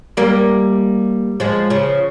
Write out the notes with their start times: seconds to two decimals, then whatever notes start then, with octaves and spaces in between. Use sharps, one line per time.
0.17 G3 A#3
1.40 F3 G#3
1.70 C#3 F3